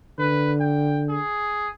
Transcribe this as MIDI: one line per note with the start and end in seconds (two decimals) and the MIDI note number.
0.19 1.19 50
0.19 0.53 71
0.60 1.03 79
1.09 1.69 68